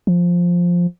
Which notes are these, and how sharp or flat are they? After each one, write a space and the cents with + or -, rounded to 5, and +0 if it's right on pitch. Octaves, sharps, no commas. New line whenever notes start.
F3 +5